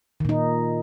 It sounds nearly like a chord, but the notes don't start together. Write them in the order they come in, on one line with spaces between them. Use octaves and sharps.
D#3 A#2 D#4